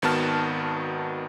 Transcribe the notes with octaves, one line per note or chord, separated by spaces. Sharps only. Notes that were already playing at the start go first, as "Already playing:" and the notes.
G#1 D#3 B3 F#4 A5 F6